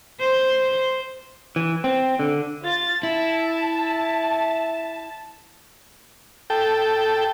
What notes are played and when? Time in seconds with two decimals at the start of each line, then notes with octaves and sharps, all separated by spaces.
0.21 C5
1.56 E3
1.84 C4
2.19 D3
2.63 F4 A6
3.03 E4 A5
6.50 A4 G5